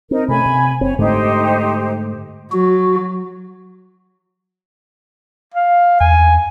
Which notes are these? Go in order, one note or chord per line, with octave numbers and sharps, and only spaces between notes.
C4 D#4 A#4
C3 A3 C#4 G#5 B5
C3
F#1 C4 C#5
G#2 D3 A3 D#4 G4 C5
F#3 F#4
F5
E2 G#5